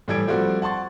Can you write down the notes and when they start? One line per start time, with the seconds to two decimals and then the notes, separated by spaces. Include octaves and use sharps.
0.08 A2 E3 G3 A4 G#6 D7
0.28 F3 G3 A3 C4 F#4
0.62 F#5 A5 C6 C#6 A6